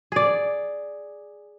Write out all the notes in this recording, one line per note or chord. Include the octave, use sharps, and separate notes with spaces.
G#4 D5